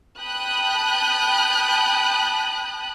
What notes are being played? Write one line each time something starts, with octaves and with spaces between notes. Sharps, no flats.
G5 A5 B5 D#6 F#6 G6